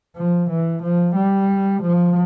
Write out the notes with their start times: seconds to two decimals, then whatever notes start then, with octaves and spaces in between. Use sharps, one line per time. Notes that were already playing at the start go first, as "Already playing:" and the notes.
0.16 F3
0.50 E3
0.82 F3
1.15 G3
1.82 F3